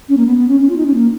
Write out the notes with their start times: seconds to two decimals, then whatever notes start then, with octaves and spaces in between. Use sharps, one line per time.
0.09 C#4
0.17 A#3
0.26 B3
0.37 B3
0.48 C#4
0.60 C#4
0.69 F4
0.77 D#4
0.87 C#4
0.94 A#3